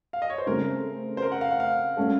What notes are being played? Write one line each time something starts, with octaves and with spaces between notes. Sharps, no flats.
F5
D#5
C#5
C5
C#3 A3 C4 A#4
C5
A#4
F#5
F5
F#5
F5
A3 C#4 A4